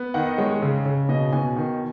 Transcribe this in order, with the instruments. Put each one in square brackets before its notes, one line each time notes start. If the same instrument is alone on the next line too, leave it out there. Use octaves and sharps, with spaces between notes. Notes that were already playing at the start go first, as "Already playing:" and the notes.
Already playing: [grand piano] B3
D#3 F#5
D#5
G#3 C#5
C#3
C#3
B2 D#5
B2 G#5
D#3